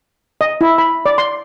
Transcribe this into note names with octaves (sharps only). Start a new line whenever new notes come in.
D#5
E4
B5
D5
C6